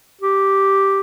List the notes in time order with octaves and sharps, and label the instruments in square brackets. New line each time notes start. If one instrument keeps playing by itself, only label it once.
[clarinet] G4